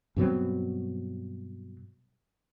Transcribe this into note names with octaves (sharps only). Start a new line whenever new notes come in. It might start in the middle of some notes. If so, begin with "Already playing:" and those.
G2 B2 F#3 C4